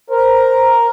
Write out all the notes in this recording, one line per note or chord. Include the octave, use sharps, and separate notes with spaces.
A#4 C5